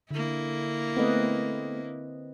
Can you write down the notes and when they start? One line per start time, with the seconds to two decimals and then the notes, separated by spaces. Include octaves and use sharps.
0.11 D3 A#3 E4
0.97 A3 B3 C4 B4 D#5